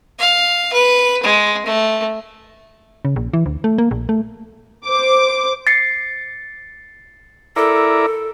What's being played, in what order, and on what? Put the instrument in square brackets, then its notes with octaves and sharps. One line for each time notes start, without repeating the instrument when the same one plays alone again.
[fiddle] F5
B4
G#3
A3
[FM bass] C#3
A#1
E3
D2
A3
A#3
A#1
A3
[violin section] C5 D6
[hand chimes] A6 C7 C#7
[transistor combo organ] E4 A#4 D5 [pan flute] A4